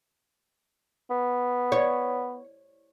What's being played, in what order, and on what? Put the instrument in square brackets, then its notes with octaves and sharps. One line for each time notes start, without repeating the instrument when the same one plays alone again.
[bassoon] B3
[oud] C#5